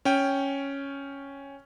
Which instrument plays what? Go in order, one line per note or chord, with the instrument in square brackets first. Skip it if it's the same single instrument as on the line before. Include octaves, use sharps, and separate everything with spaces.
[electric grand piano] C#4 G5